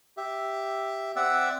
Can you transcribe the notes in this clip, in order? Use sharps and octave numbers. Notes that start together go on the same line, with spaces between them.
G4 E5
C4 D5 E5 F#5 E6